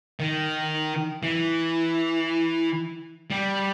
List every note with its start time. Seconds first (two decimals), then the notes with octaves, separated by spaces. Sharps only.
0.20 D#3
1.23 E3
3.31 G3